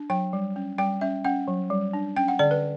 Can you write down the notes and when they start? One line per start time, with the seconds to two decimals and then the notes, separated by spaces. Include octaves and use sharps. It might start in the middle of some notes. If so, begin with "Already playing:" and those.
Already playing: D4
0.10 F#3 G5
0.33 G3
0.56 C#4
0.78 G3 G5
1.01 C#4 E5
1.25 C#4 F#5
1.48 F#3
1.70 G3
1.93 D4
2.17 C#4 G5
2.28 F#5
2.39 D3 D5
2.51 B4